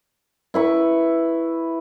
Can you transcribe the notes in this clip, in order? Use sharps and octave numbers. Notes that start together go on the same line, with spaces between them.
E4 B4 C#6